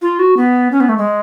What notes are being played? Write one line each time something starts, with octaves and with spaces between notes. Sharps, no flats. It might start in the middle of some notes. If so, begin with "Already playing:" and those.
F4
F#4
B3
C#4
B3
A3
G#3